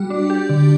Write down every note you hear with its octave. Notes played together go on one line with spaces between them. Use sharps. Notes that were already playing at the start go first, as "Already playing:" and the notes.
Already playing: G3 F#4
D4
G4
D3